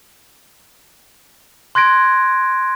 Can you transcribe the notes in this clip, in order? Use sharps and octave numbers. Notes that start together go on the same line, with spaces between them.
C6 F#6 G#6 A#6 D7